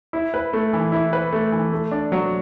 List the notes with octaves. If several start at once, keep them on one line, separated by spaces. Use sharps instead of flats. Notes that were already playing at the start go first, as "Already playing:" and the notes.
E4
B4
A3
E3
E4
B4
A3
E3
A3
D4
F#3